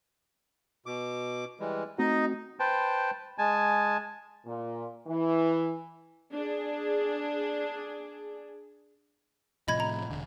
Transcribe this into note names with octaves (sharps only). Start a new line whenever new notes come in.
B2 D6
E3 G3 G#3
A3 C4 D#4 F#4 D#5
B4 C5 G5 A5
G#3 G#5 A5
A#2
E3
D4 G#4
A2 C3 F3 D#5 B5 G#6
A#5
E1 D3